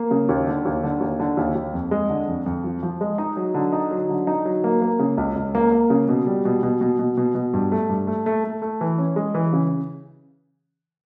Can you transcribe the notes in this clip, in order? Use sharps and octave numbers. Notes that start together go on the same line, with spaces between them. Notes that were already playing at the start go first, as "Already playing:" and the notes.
Already playing: A#3
C#3
D#2
D3
D#2
D3
D#2
D3
D#2
D#2
F2
G#3
D3
F2
F2
F3
F3
G#3
D#4
F#3
D3
D#4
F#3
D3
D#4
F#3
A#3
A#3
C#3
C#2
C#2
A#3
A#3
C#3
B2
G3
B2
B2
B2
B2
B2
B2
G2
A3
G2
A3
A3
A3
A3
E3
C#4
G#3
E3
C#3